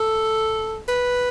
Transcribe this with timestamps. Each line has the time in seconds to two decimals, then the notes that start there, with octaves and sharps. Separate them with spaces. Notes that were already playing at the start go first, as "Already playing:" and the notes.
Already playing: A4
0.89 B4